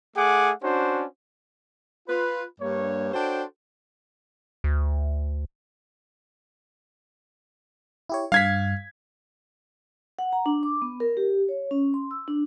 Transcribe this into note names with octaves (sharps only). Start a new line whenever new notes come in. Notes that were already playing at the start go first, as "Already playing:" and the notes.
A3 G#4 F#5 D6
C#4 D4 F#4 C5
F4 B4
G2 A#3 C#5
D4 F#4 A4 C5 C#5 G5
D2
E4 G4 C#5
G2 F5 G#6 B6
F#5
A#5
D4
D6
B3
A#4
G4
C#5
C#4
C6
E6
D4